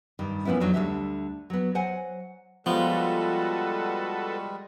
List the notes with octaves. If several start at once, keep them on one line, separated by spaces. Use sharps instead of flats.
G2 D#3 G3
A#2 F3 B3 C#4 E4
F2 D#3 F#3 D4
D2 D3 G3 E5
F#3 B3
F#3 C5 F#5 G#5
F3 G3 G#3 B3 F4 F#4 A4 B4